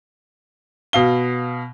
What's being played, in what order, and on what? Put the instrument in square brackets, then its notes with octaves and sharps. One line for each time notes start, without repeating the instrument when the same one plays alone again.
[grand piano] B2 F5 G7